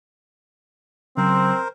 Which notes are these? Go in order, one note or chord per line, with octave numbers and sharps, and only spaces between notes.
C#3 F#3 C4 A#4 C5